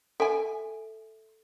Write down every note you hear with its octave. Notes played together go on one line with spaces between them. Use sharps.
A4 E5 G#5